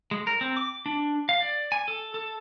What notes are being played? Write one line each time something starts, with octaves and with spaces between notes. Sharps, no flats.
G#3
A#4
C4
D6
D4
F5
D5
G#5
A4
A4